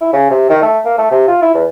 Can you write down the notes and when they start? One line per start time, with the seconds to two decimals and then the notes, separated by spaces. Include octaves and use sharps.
0.01 E4
0.13 C#3
0.30 C3
0.49 D#3
0.62 A3
0.85 A#3
0.98 A3
1.10 C3
1.27 F4
1.42 E4
1.54 E2